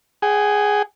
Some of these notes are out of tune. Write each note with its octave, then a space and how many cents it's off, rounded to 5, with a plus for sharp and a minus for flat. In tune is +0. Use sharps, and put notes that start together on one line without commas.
G#4 +0 F#5 +45